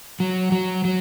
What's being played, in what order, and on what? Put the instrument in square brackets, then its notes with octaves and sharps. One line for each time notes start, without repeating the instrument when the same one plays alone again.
[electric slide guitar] F#3
F#3
F#3